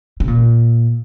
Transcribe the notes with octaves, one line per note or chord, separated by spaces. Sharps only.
C3
A#2